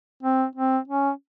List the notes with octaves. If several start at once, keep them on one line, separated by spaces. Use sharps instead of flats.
C4
C4
C#4